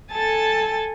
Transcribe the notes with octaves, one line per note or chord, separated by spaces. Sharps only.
A4 G#5 A5 A6